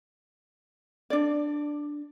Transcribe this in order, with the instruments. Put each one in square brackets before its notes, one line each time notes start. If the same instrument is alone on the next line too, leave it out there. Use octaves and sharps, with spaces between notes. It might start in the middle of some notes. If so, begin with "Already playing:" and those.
[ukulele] D4 D5